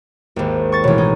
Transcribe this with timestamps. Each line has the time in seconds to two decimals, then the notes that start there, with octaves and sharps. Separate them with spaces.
0.36 G#1 D#2
0.72 C#6 A6
0.84 A1 B2 C#5
0.98 D#4